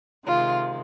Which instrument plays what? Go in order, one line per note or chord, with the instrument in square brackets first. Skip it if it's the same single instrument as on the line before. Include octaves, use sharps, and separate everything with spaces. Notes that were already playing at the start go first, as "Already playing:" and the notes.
[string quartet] C3 D#3 G#3 F4